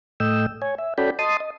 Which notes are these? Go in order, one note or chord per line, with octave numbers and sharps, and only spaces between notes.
A2 A3 D#5 G5 E6
C#5 G#5
E5
C#4 F#4 A4 D5 G5 B5
D#5 A5 C6 D#6
D#5